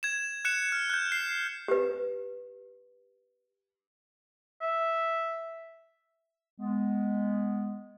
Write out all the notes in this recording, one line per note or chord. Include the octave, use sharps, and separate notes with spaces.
G#6 E7
F#6 C#7 E7
F6
F#6 G6
C7
G4 B4
E5
G#3 B3